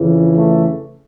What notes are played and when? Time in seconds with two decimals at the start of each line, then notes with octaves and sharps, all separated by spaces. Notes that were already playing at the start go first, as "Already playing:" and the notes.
Already playing: F2 C#3 E3
0.37 A3